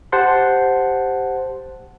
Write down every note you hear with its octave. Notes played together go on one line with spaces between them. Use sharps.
G4 C5 F#5 A5 C6